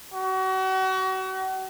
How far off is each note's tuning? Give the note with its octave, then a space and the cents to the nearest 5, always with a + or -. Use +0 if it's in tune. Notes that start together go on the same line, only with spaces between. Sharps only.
F#4 +35